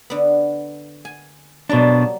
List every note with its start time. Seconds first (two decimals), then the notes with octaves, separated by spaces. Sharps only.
0.10 D3 B3
1.05 G#5
1.69 B2 F#3 G3 A#3 D4